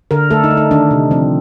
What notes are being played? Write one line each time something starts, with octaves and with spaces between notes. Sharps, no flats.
D3 A#4
A3 A4
D#4
A3
D#4
D#3 D4
C3
F3 C4